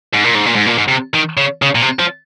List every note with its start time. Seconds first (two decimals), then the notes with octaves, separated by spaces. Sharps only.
0.14 G#2
0.25 A#2
0.35 G#2
0.46 A#2
0.56 G#2
0.66 A#2
0.78 G#2
0.88 C3
1.14 D#3
1.37 C#3
1.62 C#3
1.75 A#2
1.82 C3
1.99 F3